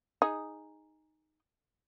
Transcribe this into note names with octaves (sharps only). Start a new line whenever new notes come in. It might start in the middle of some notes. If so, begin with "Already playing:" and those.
D#4 G#4